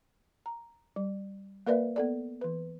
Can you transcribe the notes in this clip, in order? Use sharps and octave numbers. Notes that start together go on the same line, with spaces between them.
A#5
G3
A#3 A#4 B4 D5 E5
B3 A4 D5
E3 B4